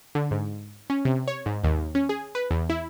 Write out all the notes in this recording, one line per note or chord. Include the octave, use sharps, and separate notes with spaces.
D3
G#2
C#4
C3
C#5
G#2
D#2
C#4
G#4
B4
E2
E4